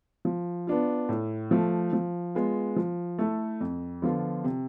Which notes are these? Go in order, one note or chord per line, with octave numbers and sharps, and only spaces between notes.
F3
B3 D4 F4
A2
F3 A3
F3
G#3 B3 F4
F3
A3 E4 A4
F2
D3 F3 B3 F4
C3